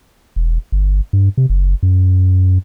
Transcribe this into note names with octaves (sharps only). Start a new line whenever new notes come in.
E1
G1
G2
C3
F#1
F#2